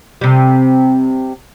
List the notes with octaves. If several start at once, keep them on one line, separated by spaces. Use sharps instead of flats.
C3 G3